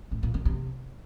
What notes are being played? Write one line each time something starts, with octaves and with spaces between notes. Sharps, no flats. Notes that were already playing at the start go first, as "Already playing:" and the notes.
A2
A#2
D#3
C3